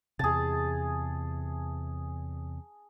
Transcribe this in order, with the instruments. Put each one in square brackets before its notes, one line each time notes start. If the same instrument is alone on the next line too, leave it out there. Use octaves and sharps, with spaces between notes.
[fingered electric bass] E2 C3 [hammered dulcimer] G#4 A5